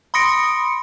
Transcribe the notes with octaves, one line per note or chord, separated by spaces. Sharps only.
B5 C6 D#6 A#6 C#7 D7